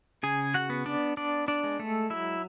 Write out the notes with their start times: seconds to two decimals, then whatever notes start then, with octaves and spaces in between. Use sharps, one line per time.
0.23 C#3 G#4 G#5
0.54 F#4 F#5
0.70 B3
0.86 D4 D5
1.17 B3 D4 D5
1.48 D4 D5
1.64 G#3
1.79 A3 A4
2.10 F#3 E4 E5